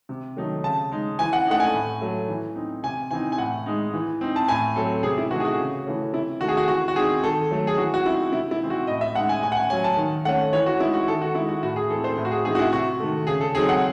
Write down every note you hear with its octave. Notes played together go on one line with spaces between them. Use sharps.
C3
D#3 F#3 A3 D#4
C#3 A5
G#3 D#4
E3 G#5
F#5
A3 D#4 F#5
G#5
A2
F#3 A3
E3
C4 D#4
C3 G#5
E3 C4 D#4 G#5
G#5
A2 F#5
G#3 D#4
E3
C4 D#4
A5
A2 G#5
F#3 C4 A4
C3 G#4
E4
E3 A3 D#4 F#4
G#4
F#4
C#3
E3 A3 C#4
C3 E4
D#3 A3 F#4
G#4
F#4
E3 F#4
F#4
C4 D#4 G#4
D#3 A4
F#3 A3
G#4
E3 F#4
F#4
C4 D#4 E4
C3 E4
E4
E3 C4 D#4
F#4
A2 D#5
E5
G#3 D#4 F#5
G#5
A2 G#5
F#5
G#5
F#3 C#4 G#5
A5
D#3
A3 C#4 F#5
E3 C#5
F#4
G#3 D#4 E4
F#4
D#3 A4
F#4
G#3 D#4 E4
F#4
A2 F#4
G#4
E3 C4 A4
C5
A2
F#4
G#4
E3 C4 D#4 G#4
F#4
E4
C3 F#4
D#3 A3
C#3 G#4
A4
F#3 C4 D#4 G#4
F#5